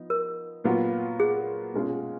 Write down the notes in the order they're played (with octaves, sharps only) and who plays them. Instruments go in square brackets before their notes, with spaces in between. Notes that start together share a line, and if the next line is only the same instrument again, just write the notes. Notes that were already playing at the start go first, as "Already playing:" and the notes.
Already playing: [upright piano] F3 B3 D#4
[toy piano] A#4
[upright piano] A#2 F#3 B3 F4
[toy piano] G#4
[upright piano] B2 G#3 C#4 F4